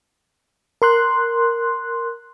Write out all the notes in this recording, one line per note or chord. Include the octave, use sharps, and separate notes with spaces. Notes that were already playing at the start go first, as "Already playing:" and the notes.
A#4 C6 F#6